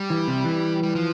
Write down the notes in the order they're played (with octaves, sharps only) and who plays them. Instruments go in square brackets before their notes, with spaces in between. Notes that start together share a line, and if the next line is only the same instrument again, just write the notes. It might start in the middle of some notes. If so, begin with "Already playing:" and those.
Already playing: [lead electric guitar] G3
[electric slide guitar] E3
C3
E3
[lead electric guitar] G3
F3